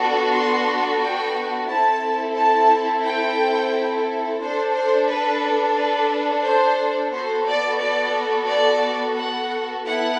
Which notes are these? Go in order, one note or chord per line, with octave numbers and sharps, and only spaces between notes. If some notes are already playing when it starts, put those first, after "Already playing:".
Already playing: B3 D4 F#4 A4
C6
G5
C4 E4 A4 A5
A5
G5
D4 A4 C5
C5
B4
B4
C5
B3 F#4 A4 C5
D5
D5
D5
F#5
B3 E4 A4 F#5